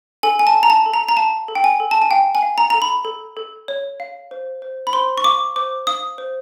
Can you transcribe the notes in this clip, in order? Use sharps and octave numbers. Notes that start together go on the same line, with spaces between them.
A4 G#5
G#5
A5
A4
A#5
A5
A4
A#5
A#5
F5 A5
A4
G5
G#5
A4
A5
G#5
F5 G5
G#5
F5
A#5
A4 A#5
B5
A4
A4
C#5
F5
C5
C5
B5
C5 C6
C#6
F5 D6
C5 D6
F5 D#6
C5